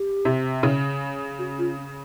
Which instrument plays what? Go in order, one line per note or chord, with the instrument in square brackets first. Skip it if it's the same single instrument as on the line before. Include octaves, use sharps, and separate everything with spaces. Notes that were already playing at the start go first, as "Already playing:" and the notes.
Already playing: [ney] G4
[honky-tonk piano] C3
C#3
[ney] F#4
F4
C#4